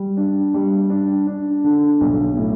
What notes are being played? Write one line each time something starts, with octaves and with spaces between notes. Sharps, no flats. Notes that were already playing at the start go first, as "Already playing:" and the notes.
Already playing: G3
D4
G3
D4
D4
D3
B1
A2